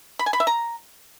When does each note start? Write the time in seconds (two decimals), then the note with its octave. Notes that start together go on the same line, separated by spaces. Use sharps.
0.19 B5
0.26 G#5
0.33 B5
0.40 E5
0.47 A#5